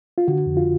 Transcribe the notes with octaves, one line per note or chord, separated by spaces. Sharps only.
F4
D3 F#4
F2
F4